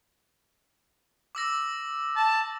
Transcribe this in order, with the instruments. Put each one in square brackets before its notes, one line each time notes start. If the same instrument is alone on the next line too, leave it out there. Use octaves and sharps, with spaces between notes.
[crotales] D6 E6 A#6
[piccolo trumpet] A5